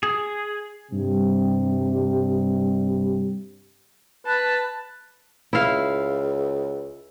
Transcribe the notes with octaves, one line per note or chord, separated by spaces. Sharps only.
G#4
G2 C3 G3
B4 A5
C#2 E4 F5